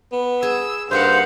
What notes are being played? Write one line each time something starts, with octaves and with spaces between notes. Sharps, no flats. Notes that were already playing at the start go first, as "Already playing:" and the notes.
B3
G#4 E6
G2 A#3 D#4 C5 F5 F#5